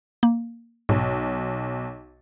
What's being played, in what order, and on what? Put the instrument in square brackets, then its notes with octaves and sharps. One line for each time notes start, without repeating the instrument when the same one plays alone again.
[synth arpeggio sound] A#3
[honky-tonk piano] B1 [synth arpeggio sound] G#2